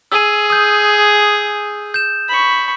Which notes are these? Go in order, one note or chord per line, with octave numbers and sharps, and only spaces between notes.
G#4 E6 D#7
D#6 G6
G6 E7
B5 C#6